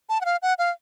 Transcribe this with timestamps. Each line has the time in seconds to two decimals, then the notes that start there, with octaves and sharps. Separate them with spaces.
0.09 A5
0.21 F#5
0.25 F5
0.42 F#5
0.58 F5